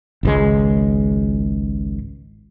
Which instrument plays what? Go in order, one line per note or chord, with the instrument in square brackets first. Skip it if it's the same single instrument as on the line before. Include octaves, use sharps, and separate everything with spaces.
[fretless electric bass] G#1 C#2 G#3